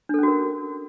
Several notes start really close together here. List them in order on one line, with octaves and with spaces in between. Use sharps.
D4 A4 C#4 F#4 A#4